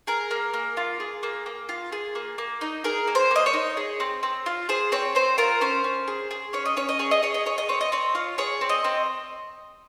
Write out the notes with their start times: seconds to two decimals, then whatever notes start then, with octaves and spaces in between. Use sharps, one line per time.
0.07 G#4 A#4
0.31 A#3
0.54 A#3
0.77 F4
1.00 G#4
1.23 A#3
1.46 A#3
1.69 F4
1.92 G#4
2.15 A#3
2.38 A#3
2.61 D#4
2.84 G#4 A#4
3.07 A#3
3.15 C5
3.31 A#3 D#5
3.46 C#5
3.53 D#4
3.77 G#4
4.00 C4
4.23 C4
4.46 F4
4.69 G#4 C5
4.92 C4 C#5
5.15 C4 C5
5.38 F4 A#4
5.61 C#4 C5
5.84 C#4
6.08 G#4
6.31 G#4
6.53 C#4 C#5
6.65 D#5
6.77 C#4 C#5
6.89 D#5
6.99 G#4 C#5
7.11 D#5
7.23 G#4 C#5
7.34 D#5
7.46 G#4 C#5
7.58 D#5
7.69 C4 C#5
7.81 D#5
7.92 C4 C#5
8.15 F4
8.38 G#4 C#5
8.61 C4
8.69 D#5
8.84 C4